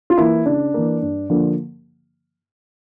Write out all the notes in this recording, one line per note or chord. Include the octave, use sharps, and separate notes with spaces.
F4
E3 A#3 E4
C#3 D4
E3 A#3
G2
D3 F3 A#3